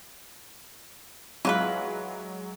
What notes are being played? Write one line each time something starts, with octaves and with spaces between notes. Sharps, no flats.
E3 F#3 G#3 F4 B4